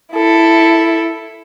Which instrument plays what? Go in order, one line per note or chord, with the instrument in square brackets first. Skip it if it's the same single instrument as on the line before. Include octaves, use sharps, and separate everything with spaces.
[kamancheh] E4 A4